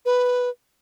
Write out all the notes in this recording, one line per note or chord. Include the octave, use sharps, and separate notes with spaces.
B4